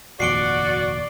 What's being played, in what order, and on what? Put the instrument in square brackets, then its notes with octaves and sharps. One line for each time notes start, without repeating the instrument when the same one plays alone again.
[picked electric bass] F1 A#1 D#2 [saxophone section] F#4 [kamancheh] D5 [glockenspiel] C7 D7 G7